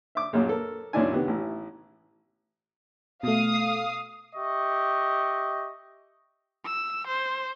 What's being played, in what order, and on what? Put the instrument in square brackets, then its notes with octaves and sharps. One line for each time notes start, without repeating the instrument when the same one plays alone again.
[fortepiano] E5 D6
A#1 F#2 A#2
A4 A#4
B1 F#2 A#2 D4 E4 G#5
C3 D#3 B3
A1 E4
[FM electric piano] B2 A3 [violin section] F5 D#6
[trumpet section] G4 D#5 E5 C#6
[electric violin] E6
C5